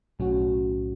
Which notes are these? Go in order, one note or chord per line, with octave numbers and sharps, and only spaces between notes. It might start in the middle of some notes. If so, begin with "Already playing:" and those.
B1 A2 F#3 C#4 F#4